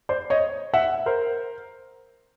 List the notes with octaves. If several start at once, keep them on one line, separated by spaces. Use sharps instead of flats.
C5 D5
C#5 D#5
E5 F#5
A#4 C5